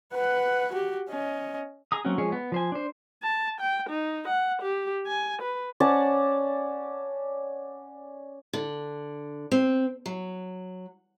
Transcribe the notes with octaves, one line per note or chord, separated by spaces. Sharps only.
B4 F#5
F#4 G4
C#4 D#5
G#4 A#5 D#6
F#3 A#3 C4 C#4 F#4
F3 G#3 G#4 C#5
B3
F3 C5 G#5
D4 C5
A5
G5
D#4
F#5
G4
G#5
B4
C#4 D5 F#5 A5
D3
C4
F#3